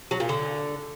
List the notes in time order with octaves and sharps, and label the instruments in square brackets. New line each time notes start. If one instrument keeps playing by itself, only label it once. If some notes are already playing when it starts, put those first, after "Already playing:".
[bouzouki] F#3
A#2
D3